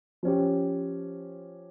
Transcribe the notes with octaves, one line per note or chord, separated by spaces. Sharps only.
F3 C#4 G4